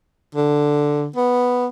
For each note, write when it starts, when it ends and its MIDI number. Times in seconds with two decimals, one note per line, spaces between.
0.35 1.07 50
1.16 1.67 59